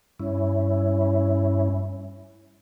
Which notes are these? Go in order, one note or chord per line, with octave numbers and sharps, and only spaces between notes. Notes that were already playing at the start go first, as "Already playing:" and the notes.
G2 C#4 E4